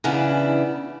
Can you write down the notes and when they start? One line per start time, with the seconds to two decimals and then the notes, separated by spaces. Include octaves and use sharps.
0.04 C#3 E3 B3 D4 E4